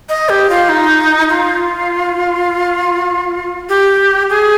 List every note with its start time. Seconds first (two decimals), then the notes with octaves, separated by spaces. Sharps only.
0.09 D#5
0.29 G4
0.50 F4
0.69 D#4
1.29 F4
3.69 G4
4.30 G#4